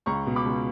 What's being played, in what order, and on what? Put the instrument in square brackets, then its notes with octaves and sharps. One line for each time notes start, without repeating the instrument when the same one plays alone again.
[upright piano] C#2 A#5 C#6
B2
B5 D6
C#2